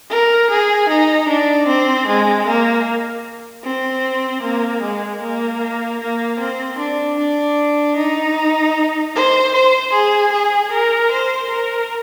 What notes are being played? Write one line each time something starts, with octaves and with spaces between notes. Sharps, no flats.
A#4
G#4
D#4
D4
C4
G#3
A#3
C4
A#3
G#3
A#3
A#3
C4
D4
D4
D#4
C5
C5
G#4
G#4
A#4
C5
A#4